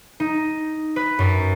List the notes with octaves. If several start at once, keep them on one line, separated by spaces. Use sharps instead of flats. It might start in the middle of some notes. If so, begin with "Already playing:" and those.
D#4
B4
F#2